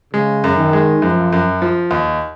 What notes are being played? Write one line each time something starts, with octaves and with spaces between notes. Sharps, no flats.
C#3 G#3
F#2
D#3
G#3
F#2 F3
F#2
F3
D#2